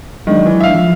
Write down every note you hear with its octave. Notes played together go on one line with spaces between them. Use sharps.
D#3 F#3 G#3 D4
E3
E5 F5
F3